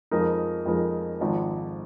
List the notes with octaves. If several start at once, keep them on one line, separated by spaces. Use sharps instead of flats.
F2 F3 G#3 D#4 A#4
F2 F3 G#3 D#4 A#4
G#1 G#2 F3